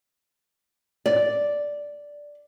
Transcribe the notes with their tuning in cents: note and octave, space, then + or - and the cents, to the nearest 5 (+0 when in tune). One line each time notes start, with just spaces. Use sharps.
D5 -5